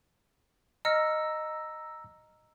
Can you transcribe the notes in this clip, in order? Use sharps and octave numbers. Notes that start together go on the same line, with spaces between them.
D#5 A#5 E6 F6 A#6 C#7